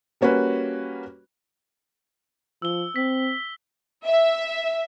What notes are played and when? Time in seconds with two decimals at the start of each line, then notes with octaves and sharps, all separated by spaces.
0.21 G3 A#3 C#4 F#4 B4
2.62 F3 E6 G7
2.96 C4 B6
4.05 E5